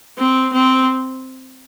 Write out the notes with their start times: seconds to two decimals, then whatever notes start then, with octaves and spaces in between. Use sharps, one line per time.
0.18 C4
0.53 C4